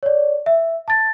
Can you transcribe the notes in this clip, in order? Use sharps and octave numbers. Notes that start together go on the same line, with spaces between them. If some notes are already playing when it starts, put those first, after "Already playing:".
C#5 D5
E5
A5 A6